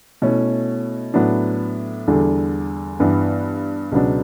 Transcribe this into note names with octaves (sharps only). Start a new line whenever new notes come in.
B2 A3 C#4 E4
A2 F#3 B3 D4
E2 D3 G3 D4
G2 E3 B3 D4
C#2 B2 F#3 B3 D4